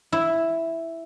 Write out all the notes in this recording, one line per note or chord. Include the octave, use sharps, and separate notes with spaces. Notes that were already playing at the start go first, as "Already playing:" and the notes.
E4